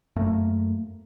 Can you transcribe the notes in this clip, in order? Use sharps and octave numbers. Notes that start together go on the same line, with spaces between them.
F#2 A3 A#3